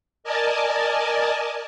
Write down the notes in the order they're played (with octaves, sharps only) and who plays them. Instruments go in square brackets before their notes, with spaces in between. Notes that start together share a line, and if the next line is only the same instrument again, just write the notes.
[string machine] A#4 D5 D#5 G#5 A5